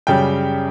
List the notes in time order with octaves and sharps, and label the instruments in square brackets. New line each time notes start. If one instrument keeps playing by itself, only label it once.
[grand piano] F#2 C#3 G3 G5